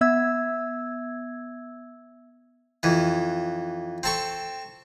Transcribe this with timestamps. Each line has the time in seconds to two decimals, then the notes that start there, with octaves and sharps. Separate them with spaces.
0.01 B3 E5 E6 G#6
2.83 F2 E3
4.03 C4 A4 C#6